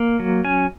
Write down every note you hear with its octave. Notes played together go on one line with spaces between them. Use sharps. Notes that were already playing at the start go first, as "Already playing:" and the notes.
Already playing: A#3
F#3
C#4 G#5